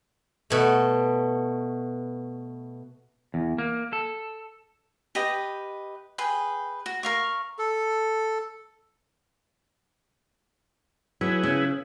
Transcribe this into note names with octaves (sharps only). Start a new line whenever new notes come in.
B2 A3
E2
A#3
A4
G4 B4 D#5 G5
G#4 B4 G5
F#4
A#4 F5 C#6
A4
F#3 E4 G#4 B4
C#3